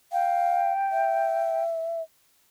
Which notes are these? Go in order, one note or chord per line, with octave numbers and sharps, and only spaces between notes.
F5 G5
E5